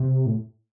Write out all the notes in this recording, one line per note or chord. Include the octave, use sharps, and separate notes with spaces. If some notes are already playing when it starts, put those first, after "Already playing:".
Already playing: C3
A2